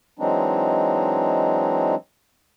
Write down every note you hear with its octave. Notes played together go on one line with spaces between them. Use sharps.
E3 F#3 G#3 C4 D4 D#4